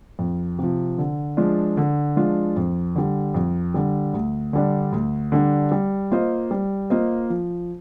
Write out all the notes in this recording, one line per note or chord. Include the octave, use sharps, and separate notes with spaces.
F2
C3 F3
D3
F3 G#3 D4 F4
D3
F3 G#3 D4 F4
F2
D3 G3
F2
D3 G3
D2
D3 G3 D4
D2
D3 G3 D4
G3
A#3 F4 C5 D#5
G3
A#3 F4 C5 D#5
F3